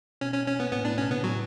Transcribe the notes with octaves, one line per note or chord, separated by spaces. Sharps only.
B2 C#4
C#4
C#4
B3
A2 B3
A2 D4
B2 C#4
C#3 B3
A2 F#3